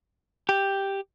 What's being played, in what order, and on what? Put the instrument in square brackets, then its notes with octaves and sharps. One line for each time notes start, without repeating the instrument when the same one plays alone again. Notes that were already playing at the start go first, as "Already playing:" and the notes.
[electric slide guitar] G4